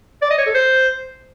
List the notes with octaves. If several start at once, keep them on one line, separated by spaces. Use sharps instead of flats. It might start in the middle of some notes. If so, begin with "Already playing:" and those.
D5
D#5
C#5
A4
C5